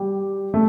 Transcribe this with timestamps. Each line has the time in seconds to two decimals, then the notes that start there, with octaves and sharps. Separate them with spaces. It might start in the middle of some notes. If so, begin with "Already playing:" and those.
Already playing: G3
0.54 A3